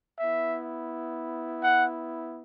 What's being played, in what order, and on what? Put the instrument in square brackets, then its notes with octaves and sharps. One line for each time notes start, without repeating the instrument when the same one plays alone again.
[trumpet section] B3 E4 E5
F#5